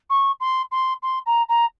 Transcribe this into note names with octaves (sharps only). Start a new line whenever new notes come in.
C#6
C6
C6
C6
A#5
A#5